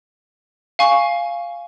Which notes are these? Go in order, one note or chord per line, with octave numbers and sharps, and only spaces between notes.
F5 G#5 C#6